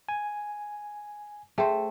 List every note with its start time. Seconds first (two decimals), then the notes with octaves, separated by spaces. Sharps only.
0.09 G#5
1.58 A3 G#4 C5 E5 G5